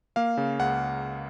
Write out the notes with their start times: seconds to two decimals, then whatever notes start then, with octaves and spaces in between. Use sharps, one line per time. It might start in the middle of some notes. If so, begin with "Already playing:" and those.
0.16 A#3 F5
0.37 C#3
0.59 C#2 F#5